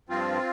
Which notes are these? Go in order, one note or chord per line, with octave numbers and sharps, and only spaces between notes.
G2 F3 C4 F4